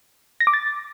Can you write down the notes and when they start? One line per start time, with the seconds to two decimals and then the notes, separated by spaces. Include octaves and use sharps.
0.40 A#6
0.47 D6
0.53 A6